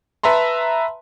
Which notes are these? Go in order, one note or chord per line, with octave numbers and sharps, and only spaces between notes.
B4 E5 A5 A#5 C6